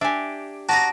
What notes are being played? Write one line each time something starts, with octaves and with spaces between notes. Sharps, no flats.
D4 G4 E5 G#5
F#4 D5 A5 A#5 D#6 A#6